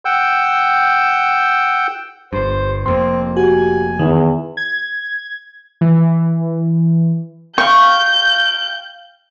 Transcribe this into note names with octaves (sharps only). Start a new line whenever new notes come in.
F#5 G5 E6 G6
G1 G2 C5
F1 F2 A#3 C4 C6
F#4 G4 G#5
E2 D#3
G#6
E3
F5 G5 C#6 G6